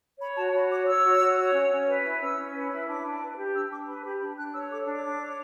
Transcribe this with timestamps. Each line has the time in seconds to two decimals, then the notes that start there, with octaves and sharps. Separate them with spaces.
0.20 C#5 B5
0.36 F#4 A5
0.53 F#4 B5
0.70 C#5 D6
0.87 C#5 E6
1.04 F#4
1.21 F#4
1.37 C#5
1.54 C#4
1.70 C#4
1.86 B4
2.04 E4
2.20 C#4 E6
2.37 C#4
2.54 B4
2.71 E4
2.88 D4 D6
3.03 D4
3.21 B4
3.37 G4
3.54 D4 E6
3.71 D4 D6
3.87 B4 B5
4.03 G4 B5
4.20 D4 B5
4.37 D4 F#6
4.53 C#5 E6
4.70 A4 D6
4.86 D4 D6
5.03 D4
5.20 C#5